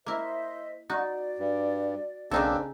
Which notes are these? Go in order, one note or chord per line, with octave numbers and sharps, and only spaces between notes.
A#3 E4 C5 D#5 E5
D#4 F#4 D5
G2
B1 C#3 A#3 C4 D4 D#4 A4